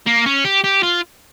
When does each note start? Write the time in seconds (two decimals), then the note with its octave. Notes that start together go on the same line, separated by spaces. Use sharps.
0.07 A#3
0.26 C#4
0.45 G4
0.64 G4
0.83 F4